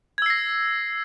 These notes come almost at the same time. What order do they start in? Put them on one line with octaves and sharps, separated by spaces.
G#6 E6 C7 A#6